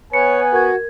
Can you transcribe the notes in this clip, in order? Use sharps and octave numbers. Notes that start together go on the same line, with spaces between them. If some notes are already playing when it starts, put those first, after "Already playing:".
B3 B4 C#5 G#5 C#7
F#4 A#4 G#6